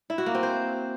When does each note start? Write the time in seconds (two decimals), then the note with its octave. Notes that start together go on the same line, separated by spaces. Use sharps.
0.10 E4
0.18 F#4
0.26 A#3
0.35 C4
0.43 C5